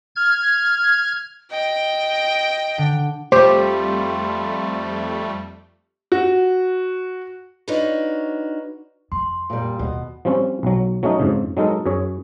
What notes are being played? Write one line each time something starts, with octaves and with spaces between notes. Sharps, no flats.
F6 G#6
D#5 G5
D3
F2 G3 A3 F4 G4 C5
F#4
D4 D#4 F4 F#4 B4 C#5
F2 C6
A#2 G3
D#2 B2
F3 G3 C4 C#4
B1 F#3
F#3 A3 C#4 D#4
F2 G#2 C#3
F#3 G#3 D#4 A4 A#4
F#2 G#4 C#5